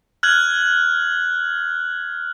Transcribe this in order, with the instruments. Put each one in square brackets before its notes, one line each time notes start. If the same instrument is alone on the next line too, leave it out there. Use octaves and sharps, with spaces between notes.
[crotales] F6 F#6 G#6 F#7